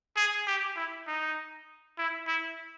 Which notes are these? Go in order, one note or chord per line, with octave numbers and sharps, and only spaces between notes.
G#4
G4
E4
D#4
E4
E4